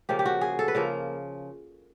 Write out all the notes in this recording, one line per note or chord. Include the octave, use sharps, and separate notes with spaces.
C#3 F3 A#3 G4
G4
F#4
G#4
A4
B4
C#3 F3 A#3 A#4